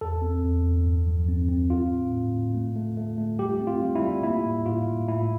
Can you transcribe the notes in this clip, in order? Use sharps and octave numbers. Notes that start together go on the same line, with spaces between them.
E2 A4
C4
E2
E2
G2
F3
C4
C4
C4 F4
A2
A2
A2
A3
A3
A3
A3
G3 G4
C4
F4
G3
E4
G3
A#3 E4
A2
A2 F4
A2
A2 E4